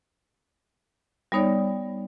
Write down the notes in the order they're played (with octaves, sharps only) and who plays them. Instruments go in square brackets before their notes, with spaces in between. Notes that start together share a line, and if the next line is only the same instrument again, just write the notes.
[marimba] G3 B3 D#4 C#5 D5